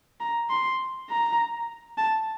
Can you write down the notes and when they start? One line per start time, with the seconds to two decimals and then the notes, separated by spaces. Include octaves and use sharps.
0.20 A#5
0.50 C6
1.10 A#5
1.98 A5